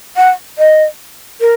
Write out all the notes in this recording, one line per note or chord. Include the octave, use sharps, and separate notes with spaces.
F#5
D#5
A#4